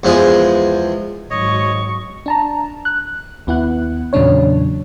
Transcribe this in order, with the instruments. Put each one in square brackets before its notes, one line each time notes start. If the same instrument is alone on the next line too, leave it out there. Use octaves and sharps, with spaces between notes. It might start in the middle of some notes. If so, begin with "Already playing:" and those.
[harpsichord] E2 F3 G#3 G#4
[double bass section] G#1 F#3 [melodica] C#5 D#5 [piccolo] C#6
[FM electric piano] D4 A5 A#5
F#6
D#2 B3 E4 F#5 F#6
E2 A#2 C#3 F#3 D4 C#5